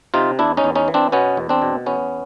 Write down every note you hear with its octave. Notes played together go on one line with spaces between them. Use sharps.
C3 D#4 F4
E2 D4 E4
C#4 D#4
E2
C#4 D#4
E3
C4 D4
B2 B3 C#4
E2
C4 D4
B2
E2 B3 C#4